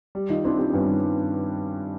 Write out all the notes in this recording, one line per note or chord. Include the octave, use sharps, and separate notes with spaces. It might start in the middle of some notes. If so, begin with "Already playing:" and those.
G3
D#3 D#4 F4
C4 D4 E4
C4 F4 G4
D4
G2 B3 C#4
D#3